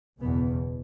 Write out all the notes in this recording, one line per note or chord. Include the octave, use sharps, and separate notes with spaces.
F#1 E2 B2 B3